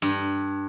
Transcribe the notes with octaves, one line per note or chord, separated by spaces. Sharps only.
G2